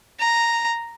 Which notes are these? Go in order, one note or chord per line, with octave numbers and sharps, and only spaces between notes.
A#5